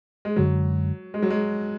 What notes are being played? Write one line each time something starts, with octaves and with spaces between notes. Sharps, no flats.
G#3
F#2 D3 F#3 G#3
G#3
F#3
G#3